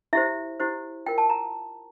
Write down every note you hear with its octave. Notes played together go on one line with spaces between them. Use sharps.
E4 G4 C5 E5
E4 G4 C5
F4 A#4 G5
A5
A#5